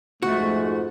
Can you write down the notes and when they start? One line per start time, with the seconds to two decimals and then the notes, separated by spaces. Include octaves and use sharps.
0.22 F2 G#2 A3 F#4